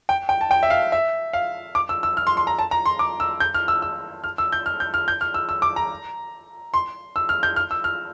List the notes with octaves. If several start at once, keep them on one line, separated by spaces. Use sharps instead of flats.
G5
G5
A5
G5
E5
F5
E5
F5
D6
E6
E6
F6
C6
C6
A#5
A5
A#5
C6
D6
E6
G6
F6
E6
E6
F6
E6
G6
F6
G6
F6
G6
F6
E6
E6
D6
A#5
C6
E6
F6
G6
F6
E6
F6